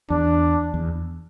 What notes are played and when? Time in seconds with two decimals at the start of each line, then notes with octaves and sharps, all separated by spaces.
0.10 E2 D4
0.74 E2